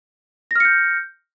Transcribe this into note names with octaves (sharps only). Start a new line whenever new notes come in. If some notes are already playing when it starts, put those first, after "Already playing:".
F6 G6 A#6 C#7